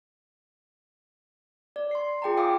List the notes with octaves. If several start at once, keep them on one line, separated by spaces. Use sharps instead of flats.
D5
C6 C7
F4 G#4 G5 A5 A#5
F5 G5 G#5 D6 D#6